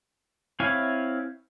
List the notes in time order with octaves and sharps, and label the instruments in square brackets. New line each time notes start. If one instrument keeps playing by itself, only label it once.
[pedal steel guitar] C4 E4 C#5 F5 G#5